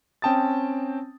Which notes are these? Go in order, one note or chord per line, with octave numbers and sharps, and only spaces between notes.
C4 C#4 G5 A5 D#6 A6